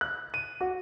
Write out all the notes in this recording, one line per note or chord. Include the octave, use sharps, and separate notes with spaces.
F#6
D#7
F#4